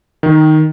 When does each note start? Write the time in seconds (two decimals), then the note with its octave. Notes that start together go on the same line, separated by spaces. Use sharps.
0.23 D#3